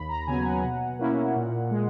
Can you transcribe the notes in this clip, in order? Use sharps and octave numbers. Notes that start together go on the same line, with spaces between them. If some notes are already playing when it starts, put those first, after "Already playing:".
Already playing: D#2 B5
A#5
C#3 F#3 B3 G#5
F#5
B2
A#3 C#4 E4
A#2
G#3